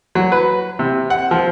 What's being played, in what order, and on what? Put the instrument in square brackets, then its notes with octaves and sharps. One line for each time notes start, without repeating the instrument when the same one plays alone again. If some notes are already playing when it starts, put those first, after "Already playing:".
[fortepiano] F#3
B4
C3
F#5
F3